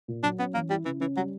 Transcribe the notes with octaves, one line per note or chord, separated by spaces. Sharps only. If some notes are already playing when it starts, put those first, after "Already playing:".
A#2
F#3 D4
B3 C#4
E3 A#3
G3 E4
C#3 E3
E3 C#4
F#3 G3